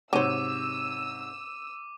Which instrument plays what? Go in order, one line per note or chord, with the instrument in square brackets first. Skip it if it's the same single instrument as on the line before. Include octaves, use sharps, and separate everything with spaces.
[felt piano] G#2 C3 C#5 [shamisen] F#3 C5 [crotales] D6 D#7 [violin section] E6